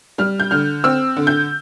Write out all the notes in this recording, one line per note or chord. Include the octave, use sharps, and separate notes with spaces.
G3 F6
G6
D3 F6
C4 E6
D3
G6